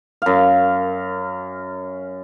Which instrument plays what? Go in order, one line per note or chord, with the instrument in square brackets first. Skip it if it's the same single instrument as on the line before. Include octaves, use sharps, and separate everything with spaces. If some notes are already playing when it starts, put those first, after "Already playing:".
[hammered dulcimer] F#2 F5